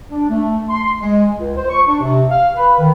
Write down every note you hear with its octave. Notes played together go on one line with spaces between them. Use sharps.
D4
A3
C6
G#3
C#2
C5
C#6
D4
C3
F5
B4
D#3